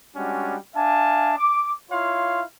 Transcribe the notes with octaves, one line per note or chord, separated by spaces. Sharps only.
G3 G#3 C#4 D4 F#4
D4 E5 F5 G#5 A5
D6
E4 F4 C#5 F5 C6